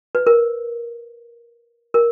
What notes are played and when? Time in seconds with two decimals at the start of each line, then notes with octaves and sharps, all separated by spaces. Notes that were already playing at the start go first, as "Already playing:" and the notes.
0.15 B4
0.27 A#4
1.94 A#4